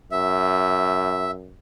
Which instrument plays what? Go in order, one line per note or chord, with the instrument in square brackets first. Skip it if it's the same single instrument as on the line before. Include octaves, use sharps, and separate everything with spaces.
[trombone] F#2 [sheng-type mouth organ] E5